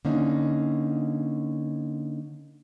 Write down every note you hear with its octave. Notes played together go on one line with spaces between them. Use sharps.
D3 A#3 C#4 D#4